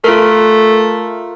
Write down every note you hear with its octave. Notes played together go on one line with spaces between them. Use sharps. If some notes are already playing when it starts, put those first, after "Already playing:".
A3 F4 A#4